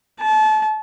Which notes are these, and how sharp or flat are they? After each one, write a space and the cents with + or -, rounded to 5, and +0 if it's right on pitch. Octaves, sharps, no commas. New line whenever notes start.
A5 -30